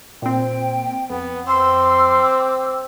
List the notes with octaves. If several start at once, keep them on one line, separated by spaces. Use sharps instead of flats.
A#2 C4 G5
F2 B3
C4 C6 D6 E6